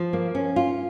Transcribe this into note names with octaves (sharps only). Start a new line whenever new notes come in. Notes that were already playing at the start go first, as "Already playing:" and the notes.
Already playing: F3
A#3
C#4
F4